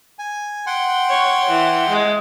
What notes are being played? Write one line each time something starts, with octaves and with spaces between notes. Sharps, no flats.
G#5
F#5 G5 C6
C#5
E3
G#3